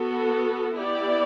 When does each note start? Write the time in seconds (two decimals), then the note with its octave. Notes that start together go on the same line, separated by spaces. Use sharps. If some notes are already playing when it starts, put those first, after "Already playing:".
Already playing: B3 F#4 A4
0.77 B3 E4 G4 D5